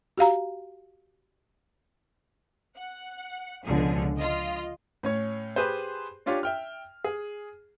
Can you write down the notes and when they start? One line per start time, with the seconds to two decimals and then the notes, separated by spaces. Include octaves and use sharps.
0.17 F#4 G4 F5 A#5
2.77 F#5
3.65 C#2 B2 D3 F3 G#4
4.16 F4 D#5
5.03 A2 C#4 C#5
5.56 G4 G#4 B4 C5
6.26 C#4 D4 F4 G4 C#5
6.43 E5 G5 F6
7.04 G#4